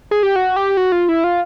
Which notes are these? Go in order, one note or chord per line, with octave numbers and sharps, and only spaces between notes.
G#4
G4
F#4
G4
F#4
F4
E4
F4